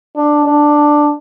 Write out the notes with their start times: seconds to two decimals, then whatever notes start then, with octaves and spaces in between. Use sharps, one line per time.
0.16 D4
0.46 D4